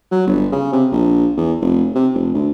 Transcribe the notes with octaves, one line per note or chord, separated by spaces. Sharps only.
F#3
G1
C#3
C3
A#1
E2
F1
C3
F1
D2